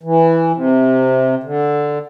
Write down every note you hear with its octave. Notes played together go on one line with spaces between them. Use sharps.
E3
C3
D3